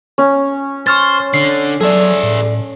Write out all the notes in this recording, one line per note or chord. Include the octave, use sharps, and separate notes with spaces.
C#4
C5 C#6 F6 A6
D3 C7
F#3 G#4 A4 D5 E5
A2